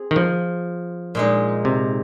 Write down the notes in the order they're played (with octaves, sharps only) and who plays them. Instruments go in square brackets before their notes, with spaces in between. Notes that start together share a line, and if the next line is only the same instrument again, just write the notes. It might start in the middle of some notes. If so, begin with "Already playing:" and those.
Already playing: [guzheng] C4 G#4
[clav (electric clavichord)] D#3
F3
[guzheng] A#2 G#3 D#4
[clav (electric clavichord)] C3